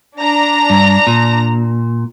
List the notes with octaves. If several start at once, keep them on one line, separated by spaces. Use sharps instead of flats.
D4 A#5
G2
A#2